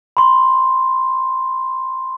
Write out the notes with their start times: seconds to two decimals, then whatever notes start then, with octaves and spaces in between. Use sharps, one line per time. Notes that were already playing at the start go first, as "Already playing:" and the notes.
0.17 B5 C6